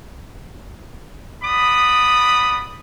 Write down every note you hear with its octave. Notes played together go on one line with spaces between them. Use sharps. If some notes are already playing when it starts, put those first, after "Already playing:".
B3 D5 B5 D#6